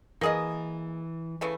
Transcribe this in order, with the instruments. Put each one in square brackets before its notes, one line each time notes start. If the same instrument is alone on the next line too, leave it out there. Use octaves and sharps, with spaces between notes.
[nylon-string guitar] E3 [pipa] A#3 G#4 D#5
[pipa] C#3 E3 A3